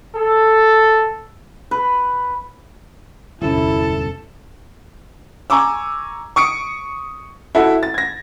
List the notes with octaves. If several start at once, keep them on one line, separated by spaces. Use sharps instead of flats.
A4
B4
D1 G1 E2 C3 C#4 E4 A4
G#5 A#5 C#6 D6 E6
C#6 D#6 C#7 D7
E4 F#4 A4 E5
A6
G#6 A#6